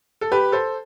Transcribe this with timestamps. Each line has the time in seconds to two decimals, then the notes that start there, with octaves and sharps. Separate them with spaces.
0.21 A4
0.32 G4 B4
0.52 A4 C5